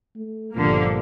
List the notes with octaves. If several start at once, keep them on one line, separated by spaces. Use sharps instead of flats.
A3
G1 G2 A#2 D3 F3 A#3